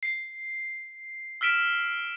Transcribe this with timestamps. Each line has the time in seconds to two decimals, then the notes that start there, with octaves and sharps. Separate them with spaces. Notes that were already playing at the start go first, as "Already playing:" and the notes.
0.03 C7
1.41 E6 F6 B6 D7 E7